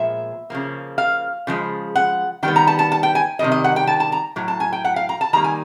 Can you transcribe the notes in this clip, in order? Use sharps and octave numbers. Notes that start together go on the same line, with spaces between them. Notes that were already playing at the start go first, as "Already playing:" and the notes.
Already playing: A#2 F3 G#3 B3 E5
C#3 F3 A#3
F5
C#3 F3 G#3
F#5
D#3 G3 B3 G5
A#5
A5
A5
A5
G5
G#5
C3 D#3 G3 D#5
D#5
F#5
G5
A5
A5
A#5
A2 F#3
A5
G#5
G5
F#5
F5
A#5
A5
D#3 G3 A#3 A#5
G#5